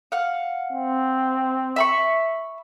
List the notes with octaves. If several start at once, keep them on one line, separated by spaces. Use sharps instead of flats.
F5 F#5
C4
E5 B5 C#6